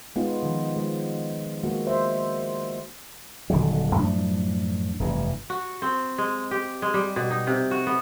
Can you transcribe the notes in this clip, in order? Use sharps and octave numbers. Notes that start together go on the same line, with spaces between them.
G#3 B3 D#4 F4
D#3 F3
G#3
G#3 A#3 F#4
C5 E5
D#1 D3 D#3 F#3
F#2 A2 F3 D4
F1 G2 E3
F#4
C4
G#3
G4
G#3
G3
B2
D#4
C3
F#4
B3